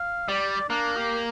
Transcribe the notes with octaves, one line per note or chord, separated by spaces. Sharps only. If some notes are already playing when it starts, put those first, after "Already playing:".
Already playing: F5
G3 D5
A#3 D4
G4